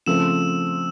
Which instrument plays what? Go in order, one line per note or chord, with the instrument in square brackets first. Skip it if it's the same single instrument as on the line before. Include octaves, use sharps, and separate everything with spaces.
[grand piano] C#3 F3 A3 C4 [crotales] E6 E7